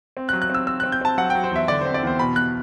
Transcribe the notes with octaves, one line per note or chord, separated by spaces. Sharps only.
C4
F#6
F#3
F#6
C4 E6
C4 E6
C4 F#6
G6
C4 A5
F#3 F#5
F#3 G5
C5
E2 E5
D3 D5
C4 C5
D5
E2 C5
B2 B5
B2 F#6